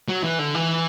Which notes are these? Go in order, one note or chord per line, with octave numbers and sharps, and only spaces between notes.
F#3
E3
D3
E3